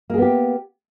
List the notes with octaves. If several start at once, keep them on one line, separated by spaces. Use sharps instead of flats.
A#3 B3 G4 G#4